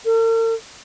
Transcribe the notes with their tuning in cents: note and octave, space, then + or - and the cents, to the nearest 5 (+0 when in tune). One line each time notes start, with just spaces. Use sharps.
A#4 -45